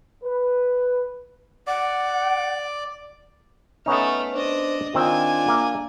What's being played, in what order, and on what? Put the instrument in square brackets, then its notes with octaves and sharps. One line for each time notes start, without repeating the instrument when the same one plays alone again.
[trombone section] B4
[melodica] D5 D6 [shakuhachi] F#5
[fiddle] A3 F6 [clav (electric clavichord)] B3 C#4 D#4
[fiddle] D4 D#5 [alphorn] C5
[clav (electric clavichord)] D#3 C4 [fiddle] D4 G#5 [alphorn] F4
[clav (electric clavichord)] A#3 E5